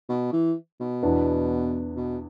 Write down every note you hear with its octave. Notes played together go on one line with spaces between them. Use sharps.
B2
E3
B2
E2 E3 B3 D4
B2